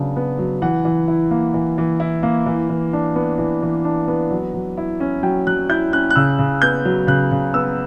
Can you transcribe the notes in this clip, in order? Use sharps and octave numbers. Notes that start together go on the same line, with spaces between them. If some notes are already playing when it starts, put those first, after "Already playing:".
Already playing: C#3 F#3 B3 D4
B3
F#3
E3 F#5
E3
E4
A#3
E3
E3
E4
A#3
E3
E3
D4
B3
E3
E3
D4
B3
F#3
F#3
E4
C#4
F#3 G5
F#3 F#6
E4 G6
C#4 F#6
F#6
C#3 E6
C#3
B3 G6
F#3
C#3 F#6
C#3
B3 E6